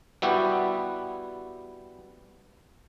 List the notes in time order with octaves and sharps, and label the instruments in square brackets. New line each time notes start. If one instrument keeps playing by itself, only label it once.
[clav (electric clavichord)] G3 B3 E4 F#4 G4